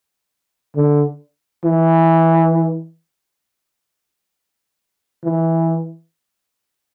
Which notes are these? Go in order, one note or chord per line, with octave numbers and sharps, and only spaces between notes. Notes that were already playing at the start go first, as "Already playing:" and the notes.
D3
E3
E3